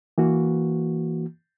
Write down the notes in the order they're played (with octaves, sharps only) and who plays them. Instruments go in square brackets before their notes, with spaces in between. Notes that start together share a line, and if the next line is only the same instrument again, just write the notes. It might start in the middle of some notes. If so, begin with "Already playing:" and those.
[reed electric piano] E3 A#3 F#4